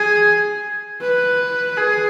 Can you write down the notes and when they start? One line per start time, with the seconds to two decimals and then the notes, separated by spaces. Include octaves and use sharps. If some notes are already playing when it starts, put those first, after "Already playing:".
Already playing: G#4
1.02 B4
1.78 G#4